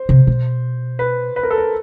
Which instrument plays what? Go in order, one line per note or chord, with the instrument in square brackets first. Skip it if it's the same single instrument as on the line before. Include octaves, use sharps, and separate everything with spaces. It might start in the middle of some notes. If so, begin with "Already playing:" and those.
Already playing: [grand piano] C5
[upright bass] C3
B2
[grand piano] B4
B4
A#4
A4
A#4